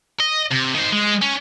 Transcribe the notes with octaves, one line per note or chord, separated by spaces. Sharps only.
D#5
C3
D#3 C5
G#3
C#4